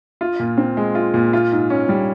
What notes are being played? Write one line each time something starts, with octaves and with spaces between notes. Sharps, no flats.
F4
A#2
C4
G#3
F4
A#2
F4
G#2
C#4
G3